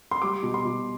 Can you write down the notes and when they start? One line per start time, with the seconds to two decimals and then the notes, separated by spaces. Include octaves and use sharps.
0.11 C6
0.22 G3 D6
0.43 B2
0.54 C6
0.64 B2